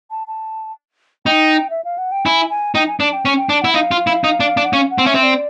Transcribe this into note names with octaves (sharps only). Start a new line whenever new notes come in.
A5
A5
D#4 G5
E5
F5
F#5
G5
E4 G#5
G#5
D#4 G5
G#5
D4 A5
G5
C#4
G5
D4 A5
E4 F#5
D#4 F5
F4
E4
D#4
D4
D4
F#5
C#4 F5
F#5
C4
C#4 E5
C4
D5